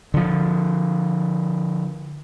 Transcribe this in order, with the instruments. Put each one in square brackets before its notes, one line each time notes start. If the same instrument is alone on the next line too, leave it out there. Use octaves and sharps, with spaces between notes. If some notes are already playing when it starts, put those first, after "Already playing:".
[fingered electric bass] D3 F3